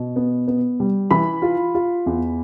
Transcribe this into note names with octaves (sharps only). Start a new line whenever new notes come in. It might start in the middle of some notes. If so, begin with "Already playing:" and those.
Already playing: B2
B3
B3
G3
E3 B5
F4
F4
E2